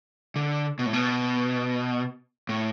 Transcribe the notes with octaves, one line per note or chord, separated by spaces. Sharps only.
D3
B2
A2
B2
A2